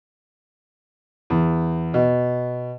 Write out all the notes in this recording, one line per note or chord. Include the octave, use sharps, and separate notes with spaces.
E2
B2